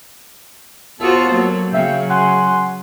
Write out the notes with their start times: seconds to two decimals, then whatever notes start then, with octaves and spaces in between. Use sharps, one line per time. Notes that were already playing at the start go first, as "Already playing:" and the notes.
1.00 D#2 B3 F4 F#4 A4 C5
1.31 F#3 A#3
1.72 C#3 F#3 E5 F5 G5
2.10 F#5 G#5 C6